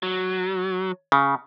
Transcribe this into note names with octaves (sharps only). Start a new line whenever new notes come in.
F#3
C#3